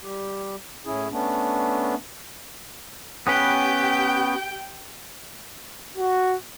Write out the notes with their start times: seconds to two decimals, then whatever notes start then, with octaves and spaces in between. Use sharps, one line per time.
0.03 G3 G4
0.85 A2 C#4 E4 G#4
1.11 A3 B3 C#4 D4
3.27 B3 C#4 G4 B4 G5
5.97 F#4